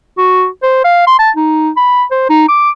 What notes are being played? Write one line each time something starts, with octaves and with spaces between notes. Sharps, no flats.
F#4
C5
F5
C6
A5
D#4
B5
C5
D#4
D6